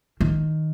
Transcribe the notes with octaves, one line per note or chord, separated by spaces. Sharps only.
D#3